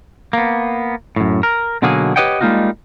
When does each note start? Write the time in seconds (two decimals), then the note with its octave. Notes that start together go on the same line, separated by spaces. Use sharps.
0.33 A#3 B3
1.16 F#2 A2
1.43 A#4
1.82 B2 D3 F#3 A#3 D#4 G#4
2.16 G4 B4 C#5 D#5 F#5 G5
2.41 G3 G#3 A#3 D#4 F4 F#4